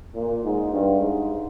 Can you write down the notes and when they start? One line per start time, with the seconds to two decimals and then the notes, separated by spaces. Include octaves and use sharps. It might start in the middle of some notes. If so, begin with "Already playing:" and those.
0.16 A#2
0.44 G#2
0.72 G2
1.00 G#2